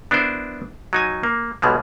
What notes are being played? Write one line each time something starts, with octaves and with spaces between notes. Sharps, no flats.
B3 D4 E4 A#4 C5
F#3 D#4 G#5
A#3
B1 B2 G3 G#3